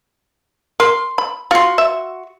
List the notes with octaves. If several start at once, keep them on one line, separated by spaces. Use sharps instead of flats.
A#4 C6
B5
F4 F#4 C6
E5